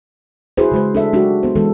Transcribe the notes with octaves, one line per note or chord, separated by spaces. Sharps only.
E4 F#4 G#4 B4 C5
C#3 G#3 C5
D4 A4 E5
G#3 D4 D#4 F#4 G4
B3 C5
E3 G#3 A4